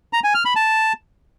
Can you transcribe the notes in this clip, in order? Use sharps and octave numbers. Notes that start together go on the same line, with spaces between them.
A#5
G#5
F6
B5
A5